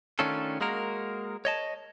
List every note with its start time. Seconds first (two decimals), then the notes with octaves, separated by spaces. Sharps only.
0.19 D#3 A3 C#4 D4 F4 A4
0.61 G#3 A#3 F#4 A#4
1.45 C#5 D#5 A5